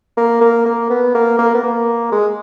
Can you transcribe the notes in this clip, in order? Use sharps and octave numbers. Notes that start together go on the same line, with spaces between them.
A#3
A#3
A#3
B3
A#3
A#3
B3
A#3
G#3